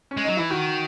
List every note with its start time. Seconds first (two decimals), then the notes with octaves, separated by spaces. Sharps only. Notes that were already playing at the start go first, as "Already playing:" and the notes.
0.11 C#4
0.17 G#3
0.24 F#3 D#4
0.37 E3 E4
0.50 D#3 F#4